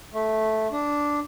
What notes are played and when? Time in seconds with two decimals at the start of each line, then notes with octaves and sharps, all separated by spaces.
0.14 A3
0.72 D4